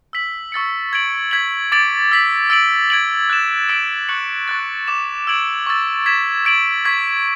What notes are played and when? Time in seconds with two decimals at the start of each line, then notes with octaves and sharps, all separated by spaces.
0.13 E6 B6 F#7
0.52 C#6 E6 A6 C#7
0.93 G#6 D7 F#7
1.31 G#6 B6 F#7
1.72 D6 A6 D7 F#7
2.12 E6 B6 F#7
2.50 E6 A6 D7 F#7
2.90 G#6 D7 F#7
3.30 F#6 A6 E7
3.69 E6 B6 D7 F#7
4.09 C#6 F#6 C#7 F#7
4.48 C#6 F#6 A6
4.87 D6 A6 E7
5.27 E6 G#6 D7 F#7
5.67 C#6 E6 A6
6.06 G#6 B6 E7
6.45 G#6 D7 F#7
6.85 C#6 G#6 B6